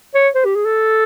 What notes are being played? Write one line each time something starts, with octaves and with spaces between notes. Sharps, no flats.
C#5
C5
G4
G#4
A4